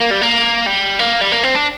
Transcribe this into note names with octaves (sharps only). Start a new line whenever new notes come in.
A#3
G3
A#3
G3
A#3
G3
A#3
C4
D4